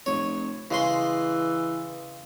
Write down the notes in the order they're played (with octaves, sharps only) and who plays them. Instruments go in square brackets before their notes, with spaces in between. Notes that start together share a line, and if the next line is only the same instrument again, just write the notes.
[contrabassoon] F1 [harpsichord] C#5
[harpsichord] C#3 G#3 C6 [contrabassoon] E3